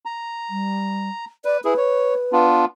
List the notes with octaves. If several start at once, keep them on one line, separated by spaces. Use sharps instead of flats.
A#5
G3
B4 D5
E4 G#4 B4
C#5
B3 D4 F4